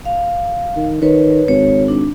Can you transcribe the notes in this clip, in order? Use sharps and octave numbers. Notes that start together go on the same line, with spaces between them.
F5
D#3
D#3 B4 C#5
G#1 C#5
D4